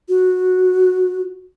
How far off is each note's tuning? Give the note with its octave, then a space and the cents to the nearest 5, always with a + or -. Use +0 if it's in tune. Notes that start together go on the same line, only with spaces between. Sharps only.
F#4 -10